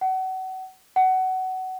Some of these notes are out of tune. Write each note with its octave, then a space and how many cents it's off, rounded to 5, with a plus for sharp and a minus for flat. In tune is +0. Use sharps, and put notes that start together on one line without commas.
F#5 +30
F#5 +20